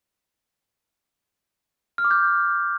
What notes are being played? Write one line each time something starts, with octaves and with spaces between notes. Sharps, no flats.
F6
D6
G6